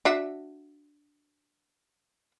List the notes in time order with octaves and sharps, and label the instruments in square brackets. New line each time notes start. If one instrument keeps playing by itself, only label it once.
[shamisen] D4 F#4 E5